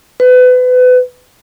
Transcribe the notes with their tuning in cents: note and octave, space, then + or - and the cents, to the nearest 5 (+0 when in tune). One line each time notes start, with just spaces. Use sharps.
B4 +30